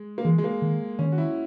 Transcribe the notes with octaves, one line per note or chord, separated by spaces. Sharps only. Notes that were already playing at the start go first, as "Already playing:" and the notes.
Already playing: G#3
A#3
E3 G#3
G#3
A#3
D#3
D#3 C#4
F#4
E4